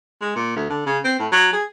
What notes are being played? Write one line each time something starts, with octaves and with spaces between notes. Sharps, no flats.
G#3
A#2
D2
D3
C#3
C4
A2
F#3
G#4